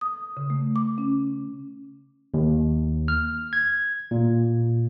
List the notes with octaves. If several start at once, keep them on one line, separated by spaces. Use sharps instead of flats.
D#6
C#3
A3
D6
C#4
D#2
F6
G#6
A#2